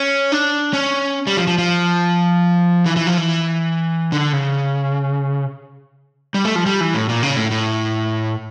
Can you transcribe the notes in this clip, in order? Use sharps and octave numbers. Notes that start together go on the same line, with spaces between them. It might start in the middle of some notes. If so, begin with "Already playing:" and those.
Already playing: C#4
D4
C#4
G3
F3
F3
F3
E3
E3
F3
E3
D3
C#3
G3
A3
F3
G3
E3
A2
A#2
C#3
A2
A2